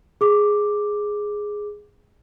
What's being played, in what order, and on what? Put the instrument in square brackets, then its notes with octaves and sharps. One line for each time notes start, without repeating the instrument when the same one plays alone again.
[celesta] G#4 D6